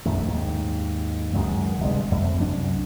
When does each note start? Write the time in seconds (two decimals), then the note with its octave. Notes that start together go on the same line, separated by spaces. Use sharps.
0.06 A#1 F#2 D#3 A3
0.25 D#2 G#2
1.34 C#2 F#2 D#3 G#3
1.80 G1 C3 G#3
2.11 F2 A3
2.41 C2 F#2 D4